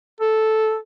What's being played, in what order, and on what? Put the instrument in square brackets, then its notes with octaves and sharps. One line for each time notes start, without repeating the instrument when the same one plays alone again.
[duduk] A4